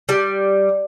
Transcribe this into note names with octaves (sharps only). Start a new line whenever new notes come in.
G3